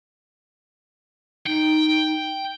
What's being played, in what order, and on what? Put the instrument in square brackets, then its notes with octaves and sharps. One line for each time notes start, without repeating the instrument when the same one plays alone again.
[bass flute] D#4 [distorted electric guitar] G5